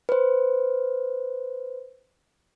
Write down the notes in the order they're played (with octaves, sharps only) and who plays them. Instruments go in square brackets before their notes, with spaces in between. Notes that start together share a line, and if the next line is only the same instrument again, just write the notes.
[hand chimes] B4 C5